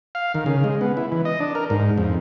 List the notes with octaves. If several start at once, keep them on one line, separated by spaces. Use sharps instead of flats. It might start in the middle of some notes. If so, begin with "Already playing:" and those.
F5
D#3
C#3
G#3
B3
E4
E3
D#5
D4
A#4
G#2
F2